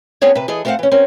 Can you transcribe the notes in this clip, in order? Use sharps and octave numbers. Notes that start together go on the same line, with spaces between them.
B3 C4 D4 G#4 C#5
C3 B4
E3 G#4 A4 D#5
A3 B3 C4 C5 F5 F#5
E3 C#4
C4 C#4 A#4